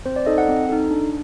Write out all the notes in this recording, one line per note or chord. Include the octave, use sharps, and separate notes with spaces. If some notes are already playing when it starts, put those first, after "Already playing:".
C4 C5
D5
D#4 A4 D#5
F#5
C4
D#4 A4
D4